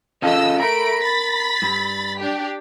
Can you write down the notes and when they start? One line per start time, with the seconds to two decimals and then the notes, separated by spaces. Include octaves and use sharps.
0.22 C#3 F4 A4 D#5 E6
0.60 A3 A#4 B5 D7
1.03 B5 A6 B6
1.62 G2
2.19 D4 G4